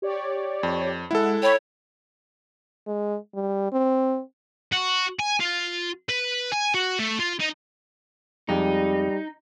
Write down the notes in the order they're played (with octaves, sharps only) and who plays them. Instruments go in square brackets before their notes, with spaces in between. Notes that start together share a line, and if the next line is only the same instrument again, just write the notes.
[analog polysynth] G4 C#5 D5
[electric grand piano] F2
[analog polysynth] G#3 F#5 [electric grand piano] E4 A4
[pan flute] C#5 [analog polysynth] G5 B5 C#6
[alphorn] G#3
G3
C4
[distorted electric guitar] F#4
G#5
F4
B4
G#5
F#4
A3
F4
D#4
[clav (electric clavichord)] F2 G#3 G4 [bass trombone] G3 [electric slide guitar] D#4